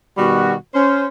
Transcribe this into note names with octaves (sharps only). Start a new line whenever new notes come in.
B2 D#3 G3 F#4
C#4 C5